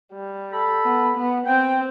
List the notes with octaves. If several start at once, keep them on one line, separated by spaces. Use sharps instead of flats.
G3
A4 B5
B3
B3
C4 G5